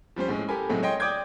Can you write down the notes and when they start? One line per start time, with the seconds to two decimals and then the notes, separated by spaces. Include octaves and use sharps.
0.16 F3 G3 C#4 C5
0.28 A2 G#3 C#4
0.48 G4 A4 A#4 G#5 B5
0.69 A2 C3 F#3 G#3 A3
0.82 C#5 D#5 G5 C6
1.00 D5 G5 D6 D#6 G6 G#6